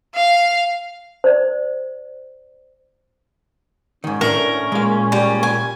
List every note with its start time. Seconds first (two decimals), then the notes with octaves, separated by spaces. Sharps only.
0.15 F5
1.24 C5 D5
4.04 G#2 D#3 C#4
4.21 A2 A3 D4 A#4
4.72 A#2 G#3 F5
5.12 G3
5.43 G#5